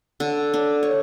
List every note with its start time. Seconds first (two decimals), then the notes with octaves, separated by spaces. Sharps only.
0.20 D3
0.54 D4
0.83 C#5